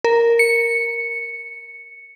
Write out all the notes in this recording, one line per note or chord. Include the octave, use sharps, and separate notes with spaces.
A#4
C#7